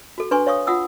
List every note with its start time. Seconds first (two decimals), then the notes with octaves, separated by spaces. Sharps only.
0.18 F#4 A4
0.31 D4 B4 G#5 C6 C#6
0.47 C#5 F5 C#6 D#6
0.67 F4 F#5 D#6 E6